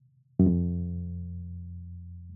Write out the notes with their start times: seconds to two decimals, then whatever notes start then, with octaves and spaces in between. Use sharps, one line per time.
0.39 F#2
0.46 F2